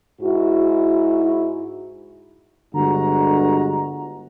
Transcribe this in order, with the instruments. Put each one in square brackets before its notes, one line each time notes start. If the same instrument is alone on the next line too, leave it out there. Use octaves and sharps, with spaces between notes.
[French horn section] G#2 E4 F#4
[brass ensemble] G1 D3 G#3 F#4 A#5